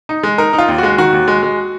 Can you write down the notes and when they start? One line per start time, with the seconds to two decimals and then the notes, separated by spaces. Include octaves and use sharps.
0.09 D#4
0.23 G#3
0.38 D#4 A#4
0.53 D#4
0.59 F4
0.68 D#2
0.78 G#3 F#4
0.98 D#3 F#4
1.13 D#2
1.28 G#3
1.43 G#3